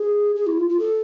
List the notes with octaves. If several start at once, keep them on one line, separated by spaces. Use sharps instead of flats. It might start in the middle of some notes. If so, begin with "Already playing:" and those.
Already playing: G#4
G#4
E4
F4
F4
A4